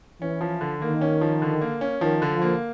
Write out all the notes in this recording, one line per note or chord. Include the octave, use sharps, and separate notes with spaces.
E3 C#4
F3
D3
D#3 A#3
C#4
F3
D3
A#3
C#4
D#3 F3
D3
F3
A#3